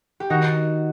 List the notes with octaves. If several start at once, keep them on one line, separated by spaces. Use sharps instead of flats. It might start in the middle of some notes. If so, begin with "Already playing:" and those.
G4
D#3 D#4 F#4